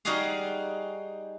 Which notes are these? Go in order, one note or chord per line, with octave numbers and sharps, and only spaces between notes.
G3 D#4 F#4 G#4 D5 F5